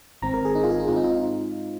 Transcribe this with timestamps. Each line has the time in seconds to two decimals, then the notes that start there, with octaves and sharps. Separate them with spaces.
0.22 G#1 G#2 D#3 C4 A#5
0.34 A#4
0.45 G#4
0.55 D#4
0.63 F4
0.71 G#4
0.80 D#4
0.88 G#2 G#3 C4 F4
0.96 D#4
1.03 F4